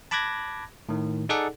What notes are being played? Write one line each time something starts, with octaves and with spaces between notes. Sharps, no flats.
A5 B5 D6 F#6 G#6 A#6
A2 D#3
D#4 G#4 A4 D5 F#5